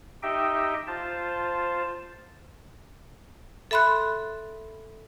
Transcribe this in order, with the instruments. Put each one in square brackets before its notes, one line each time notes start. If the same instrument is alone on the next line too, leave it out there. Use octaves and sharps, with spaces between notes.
[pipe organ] D#4 G4 D#5 E5 G5
F4 C5 A5
[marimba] A4 E5 B5 C6 F#6